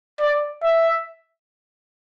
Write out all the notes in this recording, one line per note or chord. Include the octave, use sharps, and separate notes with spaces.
D5
E5